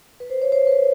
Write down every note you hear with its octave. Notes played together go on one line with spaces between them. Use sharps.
B4
C5
C#5
C5
B4